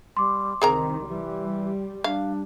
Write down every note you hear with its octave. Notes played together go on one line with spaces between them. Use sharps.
G3 C6 D6
C2 D#3 C4 G#4 A#4 A#5
E3 G3
D4 F5